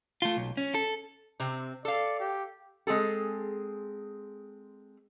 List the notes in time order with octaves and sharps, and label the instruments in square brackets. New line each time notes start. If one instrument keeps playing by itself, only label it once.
[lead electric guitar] A3 F4
B1
C#4
A4
[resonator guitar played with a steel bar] C3 C4
[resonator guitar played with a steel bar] A4 F5 [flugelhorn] D5
[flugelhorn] G4
[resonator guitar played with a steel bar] G#3 C4 G#4 A4